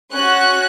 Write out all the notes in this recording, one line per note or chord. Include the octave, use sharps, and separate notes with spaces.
C#4 F#4 F#6